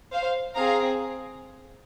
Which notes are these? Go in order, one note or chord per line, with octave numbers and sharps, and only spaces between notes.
C5 F5
C4 G#4 F5 A#5